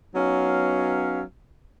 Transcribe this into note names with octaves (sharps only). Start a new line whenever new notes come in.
F#3 B3 C#4 D#4 F5